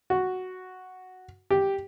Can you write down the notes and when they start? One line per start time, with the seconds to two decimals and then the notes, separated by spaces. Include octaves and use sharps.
0.10 F#4
1.51 G4